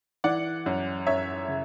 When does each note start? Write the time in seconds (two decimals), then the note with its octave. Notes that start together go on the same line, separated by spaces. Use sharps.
0.24 E3 D5 F#5
0.66 F#2
1.07 F#2 C#5 E5
1.49 C#3